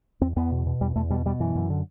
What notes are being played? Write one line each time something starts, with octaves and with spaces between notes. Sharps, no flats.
E2 C4
E2 B3
B2
B2
E2 G3
E2 A3
B2 G3
B2 G3
F#2 E3
F#2
D3